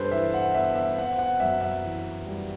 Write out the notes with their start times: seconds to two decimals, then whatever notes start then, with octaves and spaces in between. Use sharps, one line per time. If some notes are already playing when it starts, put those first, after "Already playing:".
Already playing: G2 D4 G4 A4 B4 C5
0.11 E3 E5
0.34 F#5
0.54 B3 E5
0.76 E5
0.98 C4 F#5
1.18 F#5
1.40 F#2 E5
1.61 E5
1.83 E3
2.26 G3